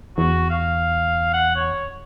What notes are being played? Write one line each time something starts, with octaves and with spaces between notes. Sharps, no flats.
E2 F#4
F5
F#5
C#5